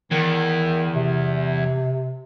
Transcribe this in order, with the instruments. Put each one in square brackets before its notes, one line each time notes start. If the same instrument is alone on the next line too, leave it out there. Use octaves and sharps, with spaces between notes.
[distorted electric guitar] E2 [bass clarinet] D#3
[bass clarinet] C3